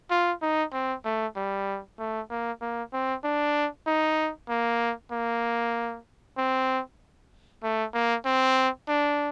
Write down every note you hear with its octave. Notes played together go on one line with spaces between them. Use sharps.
F4
D#4
C4
A3
G3
A3
A#3
A#3
C4
D4
D#4
A#3
A#3
C4
A3
A#3
C4
D4